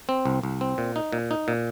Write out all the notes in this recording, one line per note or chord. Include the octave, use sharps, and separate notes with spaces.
C4
C2
C2
C4
A#2
D#4
A#2
D#4
A#2